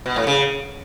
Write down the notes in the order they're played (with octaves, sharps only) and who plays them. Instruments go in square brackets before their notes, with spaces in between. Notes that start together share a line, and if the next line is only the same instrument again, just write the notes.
[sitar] B2
A2
C#3